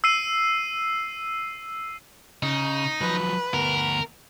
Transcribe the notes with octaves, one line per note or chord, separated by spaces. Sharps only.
E6 C7 D#7
C#3 D#4
F3 F#3 B4
D2 B3 A#4